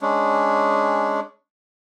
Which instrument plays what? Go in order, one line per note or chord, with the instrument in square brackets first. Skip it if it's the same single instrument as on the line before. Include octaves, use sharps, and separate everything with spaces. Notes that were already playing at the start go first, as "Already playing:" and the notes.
[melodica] G#3 C#4 D4